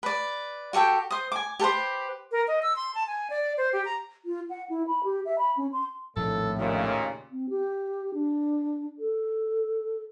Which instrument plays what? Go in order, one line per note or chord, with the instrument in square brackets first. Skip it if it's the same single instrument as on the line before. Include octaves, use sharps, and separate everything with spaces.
[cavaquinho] B4 D5
F#4 G4 A4 G5
C5 D#6
G#5 D6
G4 A4 B4 C5
[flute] A#4
D#5
E6
C6
A5
G#5
D5
C5
G4
A#5
F4
F#5
E4
B5
G4
E5
B5
C#4
C6
[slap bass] A#1 F2 D#3 [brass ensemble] A2 [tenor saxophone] A4
[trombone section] D#2 A#2 [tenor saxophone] C#3
[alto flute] C4
G4
D4
A4